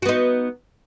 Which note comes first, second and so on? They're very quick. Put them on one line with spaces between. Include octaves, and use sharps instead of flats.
F#4 B3 D#4